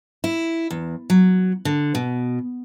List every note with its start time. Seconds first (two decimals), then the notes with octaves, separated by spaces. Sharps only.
0.24 E4
0.71 E2
1.10 F#3
1.65 D3
1.95 B2